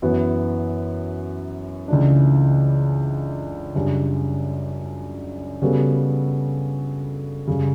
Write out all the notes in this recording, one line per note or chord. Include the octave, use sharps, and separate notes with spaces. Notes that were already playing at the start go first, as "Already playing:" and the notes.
F#2 E3 B3 F#4
C#2 C#3 E3 A3 D4
F#2 C#3 G3 D4
C#3 G3 B3 F#4 A4
F#2 C#3 G3